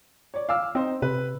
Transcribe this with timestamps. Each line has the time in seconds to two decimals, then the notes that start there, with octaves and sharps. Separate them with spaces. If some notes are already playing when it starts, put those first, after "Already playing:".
0.34 C#5 D5
0.49 F5 D6 E6
0.75 C4 D#4 C5
1.02 C3 B4